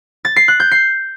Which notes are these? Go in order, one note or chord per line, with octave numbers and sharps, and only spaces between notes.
A6
C7
F#6
G6
C7